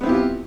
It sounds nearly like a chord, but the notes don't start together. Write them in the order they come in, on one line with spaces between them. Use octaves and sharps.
B3 C4 E4 G4 F4